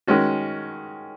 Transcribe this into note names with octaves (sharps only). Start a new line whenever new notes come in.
D#3 G#3 C#4 F#4